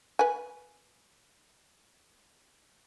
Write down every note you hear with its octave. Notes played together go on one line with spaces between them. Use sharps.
B4 G#5